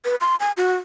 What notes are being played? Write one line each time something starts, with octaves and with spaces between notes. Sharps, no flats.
B4
C6
G#5
F#4